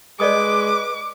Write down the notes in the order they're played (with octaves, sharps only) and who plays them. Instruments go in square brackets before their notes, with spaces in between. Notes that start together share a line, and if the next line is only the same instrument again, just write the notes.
[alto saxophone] G#3 [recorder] B4 [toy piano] D5 D#5 D#6 [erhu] D6